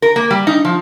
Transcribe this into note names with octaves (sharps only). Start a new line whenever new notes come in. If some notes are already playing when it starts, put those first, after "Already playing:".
A#4
A#3
G3
D#4
F3